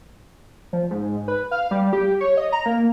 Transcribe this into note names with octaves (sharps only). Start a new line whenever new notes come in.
F3
G#2
B4
F5
G3
G4
C#5
D#5
A#5
A#3